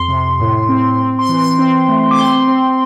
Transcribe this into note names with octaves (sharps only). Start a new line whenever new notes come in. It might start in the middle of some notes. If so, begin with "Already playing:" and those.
Already playing: F2 C6
C3
A2
C4
C4
C6
E3
C6
C4
A3
D6
C4 C6
C4